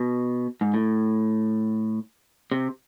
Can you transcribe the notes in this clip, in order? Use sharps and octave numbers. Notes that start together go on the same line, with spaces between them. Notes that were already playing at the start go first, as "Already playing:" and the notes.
Already playing: B2
G#2
A2
C3